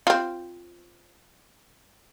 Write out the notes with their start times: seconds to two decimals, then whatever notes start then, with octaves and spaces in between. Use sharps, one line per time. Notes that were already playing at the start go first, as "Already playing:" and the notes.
0.07 C4 F4